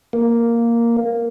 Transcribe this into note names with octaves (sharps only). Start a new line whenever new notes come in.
A#3